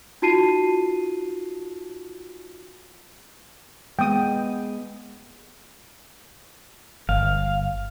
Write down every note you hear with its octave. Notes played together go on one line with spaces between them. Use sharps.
D#4 F4 F#4 A5 C7 D#7
G#3 B3 G5 D#6
G1 F5